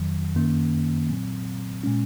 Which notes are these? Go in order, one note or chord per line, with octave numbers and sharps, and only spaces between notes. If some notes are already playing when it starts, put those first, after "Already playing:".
Already playing: F2 D#3 F#3
F#2 D#3 A#3 C#4
A#2 F#3 C4
A#2 G#3 C#4